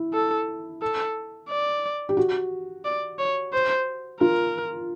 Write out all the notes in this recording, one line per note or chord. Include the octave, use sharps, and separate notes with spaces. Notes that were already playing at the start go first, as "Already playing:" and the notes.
Already playing: E4
A4
A4
D5
G4
F#4
D5
C#5
C5
F4 A#4